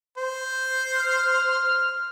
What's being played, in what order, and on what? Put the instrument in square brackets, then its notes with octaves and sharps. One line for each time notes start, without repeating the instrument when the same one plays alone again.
[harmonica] C5
[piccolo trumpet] F6